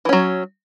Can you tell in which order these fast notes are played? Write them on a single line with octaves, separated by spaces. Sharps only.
E3 C#4 F#3